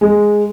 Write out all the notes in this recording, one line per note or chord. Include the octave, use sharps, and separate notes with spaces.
G#3